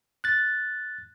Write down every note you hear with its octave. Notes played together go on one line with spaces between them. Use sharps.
F#6 A6